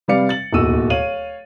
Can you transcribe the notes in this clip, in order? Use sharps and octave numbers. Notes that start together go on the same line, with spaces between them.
C3 G3 B4 D5 F5 C#7
A6 F#7
D1 D#2 B2 F#4 E6 D#7
C#5 F5 D#7 F#7